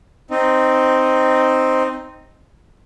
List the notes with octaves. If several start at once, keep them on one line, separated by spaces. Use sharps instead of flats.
C4 D#4